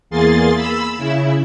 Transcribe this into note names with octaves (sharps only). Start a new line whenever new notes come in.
E2 A#3 G#4 C6 A6
B5 E6
C#3 E4